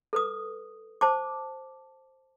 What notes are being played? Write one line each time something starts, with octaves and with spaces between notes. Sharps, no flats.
A4 B4 D#6
C5 A5 D6